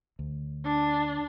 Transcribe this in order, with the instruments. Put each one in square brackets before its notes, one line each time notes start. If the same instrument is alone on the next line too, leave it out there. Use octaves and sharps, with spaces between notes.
[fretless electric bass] D2
[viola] D4